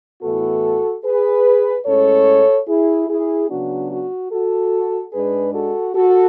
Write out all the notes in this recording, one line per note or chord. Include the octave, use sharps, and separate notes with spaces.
A2 E3 B3 F#4 A4
G#4 B4
A2 G#3 C#4 A4 C#5
E4 G#4
E4 G#4
C#3 F#3 B3 D4 F#4
F#4
F#4 A4
G#2 G#3 D4 G#4 B4
F#4 A4
F#4 A4